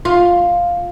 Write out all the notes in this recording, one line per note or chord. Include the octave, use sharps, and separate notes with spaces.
F4